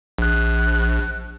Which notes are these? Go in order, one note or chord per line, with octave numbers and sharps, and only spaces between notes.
A#1 F#6